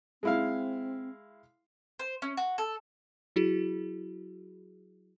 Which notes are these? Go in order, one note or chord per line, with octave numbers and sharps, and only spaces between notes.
G#3 C4 E4 F5
C5
C#4
F#4
A4
F#3 E4 F#4 G#4